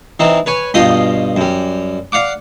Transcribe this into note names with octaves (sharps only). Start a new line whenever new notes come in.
E3 C4 D#4
B4 C#5 G#5
G2 B2 F4 D#5 G5 D#6
F#2 G3
D5 F5 F#5 D6